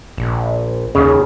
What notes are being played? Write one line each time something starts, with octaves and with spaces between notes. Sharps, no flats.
A#1
D#2 C#3